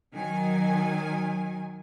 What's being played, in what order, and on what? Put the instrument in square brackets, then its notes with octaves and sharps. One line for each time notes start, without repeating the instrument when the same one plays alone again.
[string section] D#3 F#3 G#5